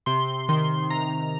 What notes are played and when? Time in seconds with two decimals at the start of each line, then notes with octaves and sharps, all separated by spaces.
0.06 C3 C6
0.49 D#3 C6
0.90 C3 A#5